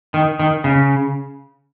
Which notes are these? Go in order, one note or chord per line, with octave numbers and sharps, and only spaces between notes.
D#3
D#3
C#3